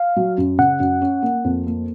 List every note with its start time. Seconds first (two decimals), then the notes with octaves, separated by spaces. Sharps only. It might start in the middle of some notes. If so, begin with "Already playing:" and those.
Already playing: F5
0.16 F#3
0.38 F#2
0.58 C#3 F#5
0.80 F#2
1.02 C#4
1.23 A#3
1.44 F2
1.67 A#3